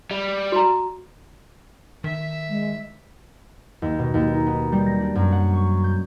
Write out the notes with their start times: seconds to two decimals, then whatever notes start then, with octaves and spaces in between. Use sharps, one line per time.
0.11 G3
0.52 F#4 A#5
2.04 D#3 E5
2.49 G#3
3.82 D#2
3.99 B2
4.14 D#2
4.34 D#4
4.47 B3
4.72 G3
4.86 A#6
5.00 D4
5.15 F#2
5.32 F#5
5.53 C#6
5.84 G6